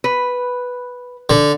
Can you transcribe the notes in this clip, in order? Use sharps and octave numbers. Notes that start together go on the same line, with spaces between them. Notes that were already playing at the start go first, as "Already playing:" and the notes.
B4
D3